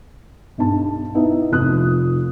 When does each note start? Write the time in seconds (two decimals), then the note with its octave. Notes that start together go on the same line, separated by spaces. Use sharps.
0.58 B1 G2 A5
1.15 B3 D#4 E4 E5
1.52 F1 F3 F4 D#6 F#6